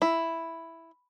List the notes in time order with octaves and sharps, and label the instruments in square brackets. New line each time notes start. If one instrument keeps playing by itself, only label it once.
[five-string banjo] E4